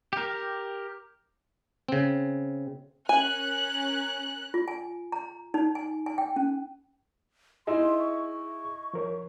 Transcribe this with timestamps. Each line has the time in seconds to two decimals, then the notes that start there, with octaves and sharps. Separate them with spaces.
0.13 G4 A#4
1.89 C#3 C4
3.09 C#4 A#4 G#5 F#6
4.54 F4
4.68 G#5
5.12 A#5
5.54 D#4
5.75 G#5
6.06 G#5
6.18 G5
6.36 C#4
7.67 D#4 E4 G#4 E5 C6 E6
7.99 C#6
8.94 F3 A#4 C#5